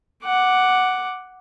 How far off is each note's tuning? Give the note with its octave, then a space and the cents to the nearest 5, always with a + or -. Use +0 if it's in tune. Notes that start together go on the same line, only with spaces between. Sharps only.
F#5 +0 D6 +0